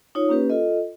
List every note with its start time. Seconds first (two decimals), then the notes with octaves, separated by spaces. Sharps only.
0.15 D#4 F4 C#5
0.29 A#3 C#4 G4 B4
0.50 F4 A4 D#5